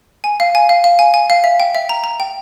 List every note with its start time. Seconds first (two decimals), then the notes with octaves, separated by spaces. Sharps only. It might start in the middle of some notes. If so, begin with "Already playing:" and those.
0.24 G#5
0.40 F5
0.55 G#5
0.69 F5
0.84 F5
0.99 G#5
1.14 G#5
1.30 F5
1.44 E5
1.60 G5
1.75 E5
1.89 A#5
2.04 A#5
2.20 G5